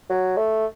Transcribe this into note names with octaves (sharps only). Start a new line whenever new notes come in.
F#3
A3